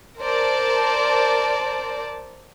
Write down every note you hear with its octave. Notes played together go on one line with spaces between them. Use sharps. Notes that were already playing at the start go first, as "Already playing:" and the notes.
A#4 C5 D5 A5